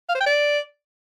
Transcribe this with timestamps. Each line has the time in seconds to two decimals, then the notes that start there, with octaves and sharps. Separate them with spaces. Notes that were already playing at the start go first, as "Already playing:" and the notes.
0.09 F5
0.15 C5
0.21 G5
0.26 D5